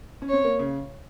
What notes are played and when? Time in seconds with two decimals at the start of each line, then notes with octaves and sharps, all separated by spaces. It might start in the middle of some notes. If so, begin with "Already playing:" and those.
0.22 C#4
0.30 C4 C#5
0.44 A#3
0.59 C#3